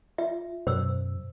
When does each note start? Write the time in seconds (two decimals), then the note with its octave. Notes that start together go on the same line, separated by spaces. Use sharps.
0.18 F4 E5
0.67 F#2 B2 C5 E6